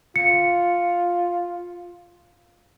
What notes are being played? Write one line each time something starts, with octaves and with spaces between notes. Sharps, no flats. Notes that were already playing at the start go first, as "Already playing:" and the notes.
F4 C#7